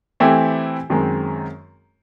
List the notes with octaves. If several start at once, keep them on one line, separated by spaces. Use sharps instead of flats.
E3 A3 C4 E4 G4
F#2 D#3 G#3 C4